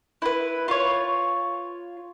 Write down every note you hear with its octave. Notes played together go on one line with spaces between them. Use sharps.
E4 B4
F4 C#5